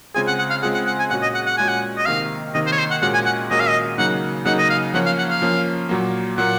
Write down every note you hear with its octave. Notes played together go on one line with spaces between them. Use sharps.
C#3 G#3 C4 F4 G#4 G#5
F#5
F#5
F5
C#3 G#3 C4 F4 G#4 F#5
F#5
F#5
G#5
A#2 G#3 C#4 F#4 F#5
D#5
F#5
F#5
A#2 G#3 C#4 F#4 G#5
F#5
D#5
C3 D#3 A#3 F5
C3 D#3 A#3 D#5
C5
C#5
C5
F#5
A#2 G#3 C#4 F#4 A#4 F#5
G#5
F#5
A#2 G#3 C#4 F#4 A#4 D#5
F5
D#5
C#3 F#3 A#3 D#4 F#5
C#3 F#3 A#3 D#4 F#5
D#5
F5
F3 A#3 C#4 F#5
F5
F#5
F5
F3 A#3 C#4
A#2 F#3 A#3
A#2 F#3 A#3 F#5